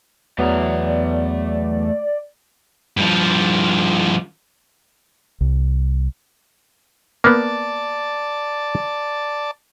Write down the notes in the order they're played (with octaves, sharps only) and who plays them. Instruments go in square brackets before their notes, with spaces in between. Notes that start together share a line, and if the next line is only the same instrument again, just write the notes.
[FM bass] E2 [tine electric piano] F#3 B3 [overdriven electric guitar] A3 A#5 [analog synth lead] D5
[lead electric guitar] G2 F3
[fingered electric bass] C2
[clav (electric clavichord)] A#3 B3 [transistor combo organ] D5 A5